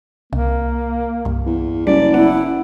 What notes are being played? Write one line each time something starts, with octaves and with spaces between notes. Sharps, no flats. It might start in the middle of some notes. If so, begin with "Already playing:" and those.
C2 A#3
C2 G2
E2
F#1 G3 D5
B3 E4 F#5